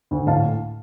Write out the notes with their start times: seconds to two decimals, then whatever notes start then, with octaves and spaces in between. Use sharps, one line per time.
0.11 D2
0.27 A2 F5 A5